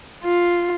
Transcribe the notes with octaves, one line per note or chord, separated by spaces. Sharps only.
F4